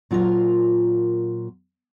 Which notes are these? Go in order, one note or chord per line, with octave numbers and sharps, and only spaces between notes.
A#2 F#3 F4 A4 A#4 C5